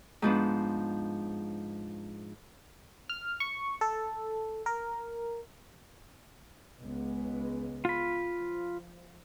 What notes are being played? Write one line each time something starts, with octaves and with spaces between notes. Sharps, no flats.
G#2 F3 B3 D4
F6
C#6
A4
A#4
C#2 G#3 B3
F4 B5
F3